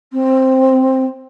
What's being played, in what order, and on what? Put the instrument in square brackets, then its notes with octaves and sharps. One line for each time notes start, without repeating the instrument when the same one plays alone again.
[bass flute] C4